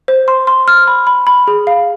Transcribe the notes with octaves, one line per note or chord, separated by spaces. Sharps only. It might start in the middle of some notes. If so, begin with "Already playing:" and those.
C5
C6
C6
F6
B5
B5
B5
G#4
F5